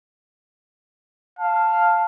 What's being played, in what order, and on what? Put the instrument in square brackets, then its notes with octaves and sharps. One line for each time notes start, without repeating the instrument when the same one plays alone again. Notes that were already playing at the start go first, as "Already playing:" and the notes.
[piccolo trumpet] F5 [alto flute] A5